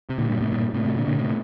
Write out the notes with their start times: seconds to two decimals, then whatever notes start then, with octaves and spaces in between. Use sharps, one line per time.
0.10 C3
0.18 A#2 D3
0.29 G2 A#2
0.41 A2 C3
0.52 G2 A#2
0.74 A2 C3
0.85 A2 C3
0.96 A#2 D3
1.07 A#2 D3
1.18 A2 C3